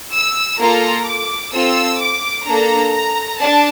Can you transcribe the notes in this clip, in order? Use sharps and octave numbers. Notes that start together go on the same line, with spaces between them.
E6
A#3 F4 A4 A#5
D6
C4 F4 A4 E6
D6
A#3 D4 A4 A#5
A#5
D4 A5